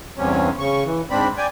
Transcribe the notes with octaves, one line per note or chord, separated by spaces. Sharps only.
E2 G2 C3 C#4
C#3 C#6
E3
G#2 C4 D4 B5
D5 G5 G#5